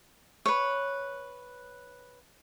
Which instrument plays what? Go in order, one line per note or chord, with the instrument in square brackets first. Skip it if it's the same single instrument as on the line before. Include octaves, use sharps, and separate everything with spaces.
[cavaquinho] B4 C#5